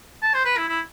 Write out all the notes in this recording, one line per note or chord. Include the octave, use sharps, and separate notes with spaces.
A5
C5
B4
E4
E4